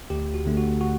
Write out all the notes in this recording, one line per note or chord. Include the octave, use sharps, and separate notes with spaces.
D2 G4
F#4
D3 A3 D4
F#4
F#4